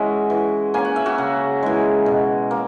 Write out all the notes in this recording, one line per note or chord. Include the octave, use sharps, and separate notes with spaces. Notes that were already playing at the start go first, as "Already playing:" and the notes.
Already playing: E3 G#3 C#4 F#4 E5 F#5
E3
A#3 C#4 G#5
F#5
E5
F#4 F#5
C#3
E3 G#3
B2
A#3